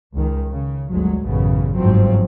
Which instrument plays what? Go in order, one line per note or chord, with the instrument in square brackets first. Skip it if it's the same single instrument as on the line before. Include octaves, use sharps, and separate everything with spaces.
[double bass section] C#2 D#3
C#3
G1 D2 F#3 G#3
A1 F#2 C#3 B3
G1 G#2 F3 F#3 C4